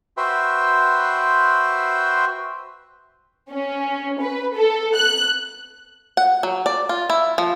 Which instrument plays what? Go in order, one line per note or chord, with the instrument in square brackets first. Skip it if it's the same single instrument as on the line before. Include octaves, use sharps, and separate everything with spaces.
[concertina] F#4 B4 C5 E5 G5 C6
[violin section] C#4
B4
A4
F#6
[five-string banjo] F#5
F#3
D5
F4
E4
F3